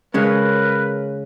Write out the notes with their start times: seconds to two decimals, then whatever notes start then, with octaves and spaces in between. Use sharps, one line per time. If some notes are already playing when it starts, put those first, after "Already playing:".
0.14 C#3 G#3 C#4 A#4 B4